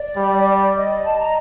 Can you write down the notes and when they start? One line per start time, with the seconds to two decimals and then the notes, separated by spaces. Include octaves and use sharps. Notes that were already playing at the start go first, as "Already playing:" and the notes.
Already playing: D5
0.17 G3
0.76 D#5
1.05 A5
1.20 A#5